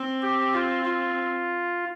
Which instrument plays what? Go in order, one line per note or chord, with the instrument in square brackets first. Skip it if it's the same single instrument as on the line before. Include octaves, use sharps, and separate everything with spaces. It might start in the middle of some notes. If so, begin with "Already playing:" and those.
Already playing: [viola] C4
[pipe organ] G4
F4
F4